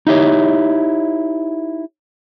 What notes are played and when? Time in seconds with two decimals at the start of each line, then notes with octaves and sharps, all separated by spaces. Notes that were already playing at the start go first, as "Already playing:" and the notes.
0.07 D#4 E4 G4 C#5